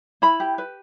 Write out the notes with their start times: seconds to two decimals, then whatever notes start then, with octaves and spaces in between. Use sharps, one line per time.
0.22 E4 B5
0.40 G4
0.58 B4